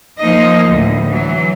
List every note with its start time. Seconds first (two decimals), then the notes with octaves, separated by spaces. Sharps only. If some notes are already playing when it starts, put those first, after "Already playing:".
0.20 F3 A#3 D#4 D#5
0.68 D2 A2
1.09 E3 F#3